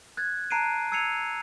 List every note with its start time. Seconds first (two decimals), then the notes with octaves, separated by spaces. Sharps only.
0.17 F#6 G#6 A6
0.50 A5 A#5 F#6 C7 D7 D#7
0.92 E6 G#6 C7 C#7 D#7 F7